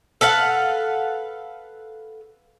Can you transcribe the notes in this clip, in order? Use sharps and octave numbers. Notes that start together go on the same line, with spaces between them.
A4 B4 F5 F#5